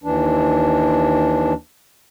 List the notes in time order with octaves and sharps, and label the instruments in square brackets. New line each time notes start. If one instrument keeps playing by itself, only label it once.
[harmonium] D#2 E3 D4